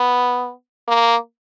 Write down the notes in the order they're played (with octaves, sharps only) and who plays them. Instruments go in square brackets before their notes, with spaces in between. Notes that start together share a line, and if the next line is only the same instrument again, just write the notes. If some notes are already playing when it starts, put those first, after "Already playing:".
Already playing: [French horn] B3
A#3